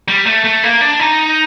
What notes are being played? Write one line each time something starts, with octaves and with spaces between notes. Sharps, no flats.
G3
A3
A3
A#3
D4
D#4